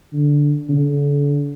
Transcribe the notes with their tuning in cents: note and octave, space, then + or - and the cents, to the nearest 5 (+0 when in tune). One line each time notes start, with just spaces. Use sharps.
D3 -10
D3 -40